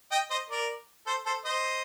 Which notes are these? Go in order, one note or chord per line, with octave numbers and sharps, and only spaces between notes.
D#5 G5
C5 D#5
A#4 D5
A4 C5
A4 C5
C5 D#5